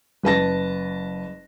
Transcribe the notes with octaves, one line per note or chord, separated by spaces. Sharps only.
F#1 B4 A5 A#6